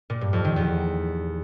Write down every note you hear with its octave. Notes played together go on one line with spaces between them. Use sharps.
A#2
G2
F2
D#3
E2